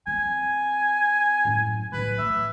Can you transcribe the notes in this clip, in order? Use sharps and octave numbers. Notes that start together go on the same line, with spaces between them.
C4 G#5
F#2 A2
A1 C#3 B4
A3 E5